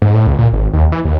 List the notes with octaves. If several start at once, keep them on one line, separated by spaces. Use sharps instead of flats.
G#2
A2
C#2
A#2
G#1
D#2
E3
D#2